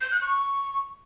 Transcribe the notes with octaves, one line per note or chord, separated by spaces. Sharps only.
G6
F#6
C#6